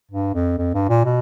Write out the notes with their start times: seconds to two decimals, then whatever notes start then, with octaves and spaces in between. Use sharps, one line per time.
0.11 G2
0.34 F2
0.58 F2
0.74 G2
0.89 A#2
1.05 B2